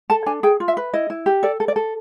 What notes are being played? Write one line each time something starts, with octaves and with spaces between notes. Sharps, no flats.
A4 A5
D4 G#5
G#4 G5
F4
E5
B4
E4 D#5
E4
G4
A4 D5
A4
D5
A4